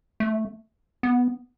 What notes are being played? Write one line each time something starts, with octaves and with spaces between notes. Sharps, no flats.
A3
B3